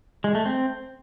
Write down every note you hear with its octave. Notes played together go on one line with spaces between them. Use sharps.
G#3
A3
C4